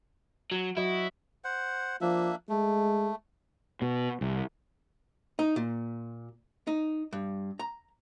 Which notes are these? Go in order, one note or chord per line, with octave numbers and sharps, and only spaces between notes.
F#3
F#3 E4 F#4 D#5
C5 F#5
F3 A#3 D4 E5
G#3 A3
B2
C2
D#4
A#2
D#4
G2
A#5